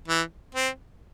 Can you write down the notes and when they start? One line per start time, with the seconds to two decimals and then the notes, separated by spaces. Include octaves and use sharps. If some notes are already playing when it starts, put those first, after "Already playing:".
0.08 E3
0.55 C4